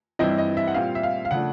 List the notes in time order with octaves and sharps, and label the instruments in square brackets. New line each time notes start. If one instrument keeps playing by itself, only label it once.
[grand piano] G2 E3 G3 C4 E4 D#5
D#5
E5
F#5
A#2 G3 C4 F5
E5
F5
F5
C#3 F3 A3 D4 F#5